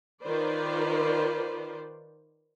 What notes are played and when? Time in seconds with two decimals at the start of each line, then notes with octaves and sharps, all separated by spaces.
0.22 D#3 F4 B4 C5 D5